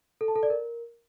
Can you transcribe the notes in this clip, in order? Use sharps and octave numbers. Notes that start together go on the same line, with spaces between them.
A4
A5
A4
D5
A#4